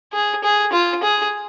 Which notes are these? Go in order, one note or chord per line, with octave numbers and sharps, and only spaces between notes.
G#4
G#4
F4
G#4